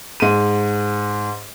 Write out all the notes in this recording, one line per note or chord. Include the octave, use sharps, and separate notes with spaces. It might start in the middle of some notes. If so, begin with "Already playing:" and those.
G#2 D#7